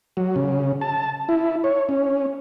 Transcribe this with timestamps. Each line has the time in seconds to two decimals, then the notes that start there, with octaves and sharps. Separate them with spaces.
0.17 F#3
0.36 C#3
0.81 A5
1.29 E4
1.64 C#5
1.89 C#4